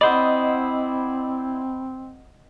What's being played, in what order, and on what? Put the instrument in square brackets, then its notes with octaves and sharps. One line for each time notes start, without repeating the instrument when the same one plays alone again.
[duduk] C4 [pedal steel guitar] E4 C5 D5 [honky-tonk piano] D#5 F#5 [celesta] B5